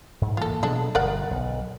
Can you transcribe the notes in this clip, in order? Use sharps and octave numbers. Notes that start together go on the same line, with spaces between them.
G#2
E3 G#3 A#3 F4 A4
B2 F#3 G#3 D4 A4
G1 A#4 D5 F#5
B1